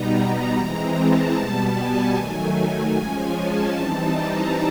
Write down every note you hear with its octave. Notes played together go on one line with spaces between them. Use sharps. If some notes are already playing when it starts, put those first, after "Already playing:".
Already playing: B2 G3 B3 D#4 A#5
E3 G#3 C4
A5
B2 G3 B3
G#5
D#3 F#3 A3 G#5
F3 G#3 C#4
A5
E3 G3 C4 D#4
A#5